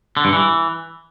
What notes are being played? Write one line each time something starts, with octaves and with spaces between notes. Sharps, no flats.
D3
G2
E3